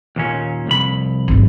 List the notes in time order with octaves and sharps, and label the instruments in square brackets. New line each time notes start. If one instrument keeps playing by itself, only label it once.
[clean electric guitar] D#2 A#2 C#4
C2 F2 B5
[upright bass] G#1 F#2